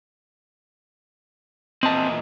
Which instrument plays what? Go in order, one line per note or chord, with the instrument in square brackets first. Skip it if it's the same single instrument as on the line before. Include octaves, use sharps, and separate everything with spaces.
[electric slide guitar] E2 A#2 D#5 [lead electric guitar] C4 A5